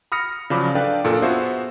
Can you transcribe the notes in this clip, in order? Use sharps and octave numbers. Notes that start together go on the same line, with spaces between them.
B5 D#6 F6 A#6 C#7
C#3 F3 F#3 D5 B5 D6
D4 A4 B4 D5 F5 G5
F#2 A#2 D4 A4 A#4 F5
B3 F4 F#4 G#4 C5 E5